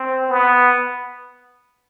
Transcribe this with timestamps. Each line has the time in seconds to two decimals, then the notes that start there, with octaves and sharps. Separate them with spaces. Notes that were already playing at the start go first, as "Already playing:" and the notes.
Already playing: C4
0.29 B3